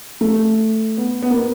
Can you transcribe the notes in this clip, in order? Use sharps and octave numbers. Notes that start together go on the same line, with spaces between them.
A3
B3
B3
A#3
B3